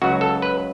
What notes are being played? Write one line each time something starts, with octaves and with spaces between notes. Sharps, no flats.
C#2 C#3 F#3 F#4
A4
B4